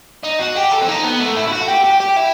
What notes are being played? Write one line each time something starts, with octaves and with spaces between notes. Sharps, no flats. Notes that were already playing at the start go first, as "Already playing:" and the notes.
D#4
F#4
G4
A4
C4
D#4
B3
A3
E4
E4
F#4
G4
G4
G4
E4